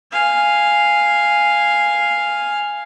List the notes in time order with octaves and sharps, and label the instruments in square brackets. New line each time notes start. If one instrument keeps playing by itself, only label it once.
[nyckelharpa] F5 G#5